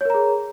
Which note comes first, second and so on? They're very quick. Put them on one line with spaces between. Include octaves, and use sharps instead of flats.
C#5 A#4 A#5 G#4